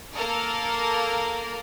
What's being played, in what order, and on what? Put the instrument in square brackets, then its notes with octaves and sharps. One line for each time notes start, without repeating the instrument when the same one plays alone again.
[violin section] A#3 A4 A#4